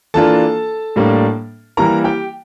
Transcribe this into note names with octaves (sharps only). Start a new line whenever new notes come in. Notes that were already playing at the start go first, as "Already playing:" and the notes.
E3 A#3 D4 F4 A4 A5
A2 G3 A#3 D4
E3 G3 A#3 E4 A#4 A#5
G4 G5